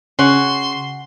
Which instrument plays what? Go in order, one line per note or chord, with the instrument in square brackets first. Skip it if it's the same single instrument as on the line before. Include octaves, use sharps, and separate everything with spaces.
[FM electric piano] C#3 [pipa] C#4 F#4 [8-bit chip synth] C6